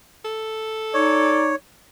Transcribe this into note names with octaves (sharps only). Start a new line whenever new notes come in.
A4
D#4 C#5 D5